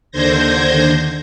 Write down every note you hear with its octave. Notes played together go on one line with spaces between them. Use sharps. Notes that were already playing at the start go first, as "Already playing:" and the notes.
D#2 D3 C5 G6 G#6 A#6